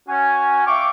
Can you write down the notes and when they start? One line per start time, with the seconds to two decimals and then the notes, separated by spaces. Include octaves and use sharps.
0.09 C#4 F#4 G#5
0.67 D5 E5 F5 G5 C#6 D6